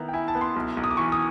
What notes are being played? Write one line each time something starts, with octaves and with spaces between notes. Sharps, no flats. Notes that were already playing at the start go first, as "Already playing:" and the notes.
Already playing: D#3 B3 E4 A#5
G5
E4 G#5
A5
B3
C6
B1
B1
D#6
D6
E3 C#6
D#6